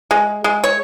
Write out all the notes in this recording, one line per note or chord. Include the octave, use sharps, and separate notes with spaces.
G#3
G#3
C#5